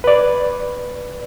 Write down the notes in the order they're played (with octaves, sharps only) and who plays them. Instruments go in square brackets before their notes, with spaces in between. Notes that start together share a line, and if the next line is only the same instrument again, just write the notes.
[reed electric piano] B4 D5